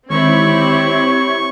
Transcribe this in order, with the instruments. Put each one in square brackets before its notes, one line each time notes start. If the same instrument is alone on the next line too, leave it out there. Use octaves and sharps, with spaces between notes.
[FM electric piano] D3 D#3 G#3 [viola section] C4 E4 G4 [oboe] C#5 [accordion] C#6